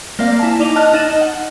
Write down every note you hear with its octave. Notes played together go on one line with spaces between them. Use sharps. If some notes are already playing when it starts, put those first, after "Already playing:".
A#3 C4 D5 F5
E4 G#5 A5
D#4 D5 D6 F7 G7
D#5 A5 F6 F#6
D#4 D#5 A6 E7 F#7
F#5